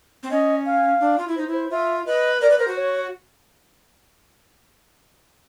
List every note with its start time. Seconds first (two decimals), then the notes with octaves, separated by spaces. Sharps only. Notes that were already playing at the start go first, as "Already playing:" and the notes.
0.23 C4
0.31 C#4 D#5
0.66 F5
1.00 D4
1.19 F4
1.28 E4
1.36 D#4 C5
1.48 E4
1.53 C5
1.70 F4 E5
2.06 B4 D#5
2.41 A#4 D5
2.50 B4
2.59 A#4 C5
2.68 F#4
2.76 C#5